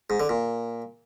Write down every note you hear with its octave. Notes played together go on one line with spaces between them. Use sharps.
G#2
D3
A#2